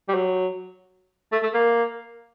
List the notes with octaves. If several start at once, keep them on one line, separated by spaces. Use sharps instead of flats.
G3
F#3
A3
A3
A#3